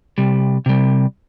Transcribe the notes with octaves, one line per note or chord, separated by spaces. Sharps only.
C3 G3
C3 G3